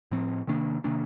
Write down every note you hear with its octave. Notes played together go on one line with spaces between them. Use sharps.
A2 F3 C4
C3 D#3 A#3 D4
C3 D#3 A#3 D4